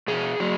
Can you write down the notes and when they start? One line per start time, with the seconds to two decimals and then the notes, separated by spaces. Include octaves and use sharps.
0.08 B2 G#4
0.40 F#3